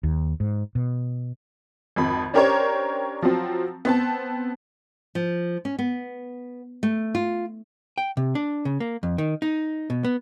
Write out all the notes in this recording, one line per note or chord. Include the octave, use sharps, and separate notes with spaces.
D#2
G#2
B2
G#1 F2 B5
C#4 D4 G4 A#4 C5 C#5
F3 F#3 C4
B3 C4 A5
F3
C#4
B3
A3
F4
G5
C3
D4
C#3
A#3
F2
D#3
D#4
B2
B3